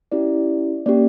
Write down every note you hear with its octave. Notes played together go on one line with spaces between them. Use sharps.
C#4 E4 G4 D5
A#3 C#4 G4 D5